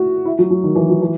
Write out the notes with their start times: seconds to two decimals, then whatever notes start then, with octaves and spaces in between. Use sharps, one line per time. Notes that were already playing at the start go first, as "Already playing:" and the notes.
Already playing: E4 F#4
0.25 E4
0.39 F#3
0.51 F#3
0.64 D#3
0.76 E3
0.89 F#3
1.02 E3